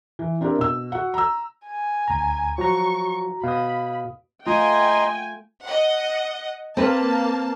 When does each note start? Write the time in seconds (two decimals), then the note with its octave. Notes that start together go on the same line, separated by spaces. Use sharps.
0.19 E3
0.41 C4 D4 E4 G4 A#4
0.59 B2 E6
0.92 F#4 F#5
1.14 A#5 E6
1.67 G#5
2.08 D2 A#5
2.58 F3 F#3 F#4 A#5 C#6
3.44 B2 F5 B5 D#6
4.47 A3 F4 D#5 G5 G#5 A#5 C6
5.65 D#5 F#5
6.77 A#3 C4 B4 A5